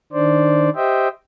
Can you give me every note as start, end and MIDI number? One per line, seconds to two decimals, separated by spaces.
0.13 0.70 51
0.13 0.70 62
0.13 0.70 72
0.13 0.70 74
0.76 1.08 67
0.76 1.08 72
0.76 1.08 75
0.76 1.08 76
0.76 1.08 79